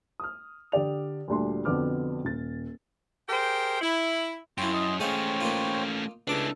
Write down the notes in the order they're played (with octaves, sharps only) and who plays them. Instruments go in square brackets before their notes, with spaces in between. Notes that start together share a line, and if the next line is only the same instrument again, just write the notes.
[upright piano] D#6 F6
D3 G4 D5 F7
D2 A#2 G3 D4 F#4 C6
F2 B2 D3 B3 D6 F6
D#1 A6
[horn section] G4 G#4 A#4 C5 G5
E4
[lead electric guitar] F#2 [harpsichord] E4 G5 [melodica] F4 C#5 C6
[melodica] D#5 C6
[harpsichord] G#3 D#5 F5 [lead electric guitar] A3 C#4 [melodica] C5 C#5 G5
[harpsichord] A#3 D#4 F4
[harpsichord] C#2 D6 [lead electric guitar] D4 E4 [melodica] A4